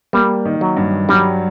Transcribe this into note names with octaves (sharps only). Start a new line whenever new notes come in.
G3 A#3
D#3
F#3
G2
F#3 G3